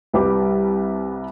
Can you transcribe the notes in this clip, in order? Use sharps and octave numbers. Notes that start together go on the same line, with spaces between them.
C2 G3 B4 G5 D6